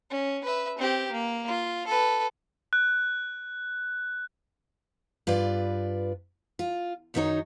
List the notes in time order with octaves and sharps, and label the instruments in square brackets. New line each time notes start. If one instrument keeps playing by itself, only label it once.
[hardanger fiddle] C#4
B4 E5
C4 G4
A#3
F4
A4 B4
[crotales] F#6
[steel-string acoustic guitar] G2 F4 B4 D5
F4
F#2 D#3 F#3 A3 D#4 C#5